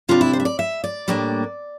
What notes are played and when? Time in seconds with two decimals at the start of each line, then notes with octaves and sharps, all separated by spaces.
0.09 C3 G3 D4 F4
0.21 E4
0.33 C5
0.40 E5
0.45 D5
0.59 E5
0.84 D5
1.08 A2 G3 A#3 D4